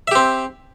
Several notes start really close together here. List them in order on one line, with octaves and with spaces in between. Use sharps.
E5 G4 C4